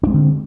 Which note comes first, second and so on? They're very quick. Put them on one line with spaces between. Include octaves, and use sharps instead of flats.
D4 G#3 C4 D3